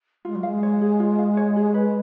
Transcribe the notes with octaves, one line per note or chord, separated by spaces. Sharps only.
G#3 F4
F#3
G#3 F5
C#5
G#4
F4
F5
C#5
G#4
B4